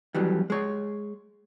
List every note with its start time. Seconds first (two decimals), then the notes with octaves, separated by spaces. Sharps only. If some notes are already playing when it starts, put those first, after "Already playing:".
0.15 F2 E3 F#3 G3
0.50 G#3 C#5